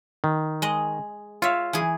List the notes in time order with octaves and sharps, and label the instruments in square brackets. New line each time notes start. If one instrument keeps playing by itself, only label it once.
[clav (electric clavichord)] D#3
[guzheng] G#3 D#5
[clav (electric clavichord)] F4 F5 [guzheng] C#5 E5
[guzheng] E3 G#4